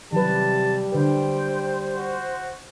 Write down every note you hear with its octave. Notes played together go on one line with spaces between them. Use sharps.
C3 D#3 F#3 G3 B4 A5
D3 B4 C5 G5
F#4